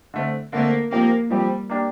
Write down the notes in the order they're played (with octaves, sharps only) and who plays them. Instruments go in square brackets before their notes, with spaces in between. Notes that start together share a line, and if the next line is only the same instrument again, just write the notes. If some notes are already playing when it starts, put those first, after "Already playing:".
[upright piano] D3 A3 C4
[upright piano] D3 A3 C4 [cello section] A#3
[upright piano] F3 C4 G4 [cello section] A#3
[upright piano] F3 C4 G4 [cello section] G3
[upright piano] A#3 D4 G4